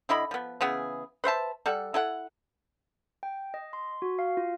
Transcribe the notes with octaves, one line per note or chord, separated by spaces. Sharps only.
D3 E4 D#5 B5
F3 B3
C#3 E3 B3 G#4
B4 C5 E5 A5
G3 A4 F#5
E4 A4 F#5
G5
D#5
C6
F#4
F5
F4